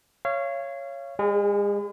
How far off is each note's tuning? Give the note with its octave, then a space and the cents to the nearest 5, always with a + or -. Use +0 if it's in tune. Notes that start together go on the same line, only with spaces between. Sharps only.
C#5 +0 F5 -30
G#3 -40 G#4 +0